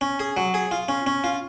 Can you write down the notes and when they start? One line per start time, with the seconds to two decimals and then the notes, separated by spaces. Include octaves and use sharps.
0.01 C#4
0.20 G#4
0.37 F#3
0.54 G#4
0.71 F4
0.89 C#4
1.06 C#4
1.24 F4